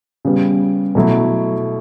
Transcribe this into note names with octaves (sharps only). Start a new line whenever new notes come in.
C#3 G3 B3
B2 F#3 A3 E4